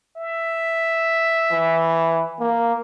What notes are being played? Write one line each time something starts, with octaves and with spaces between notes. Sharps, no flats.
E5
E3
A#3